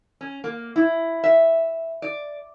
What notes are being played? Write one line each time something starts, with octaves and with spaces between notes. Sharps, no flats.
C#4
A#3
E4
E5
D5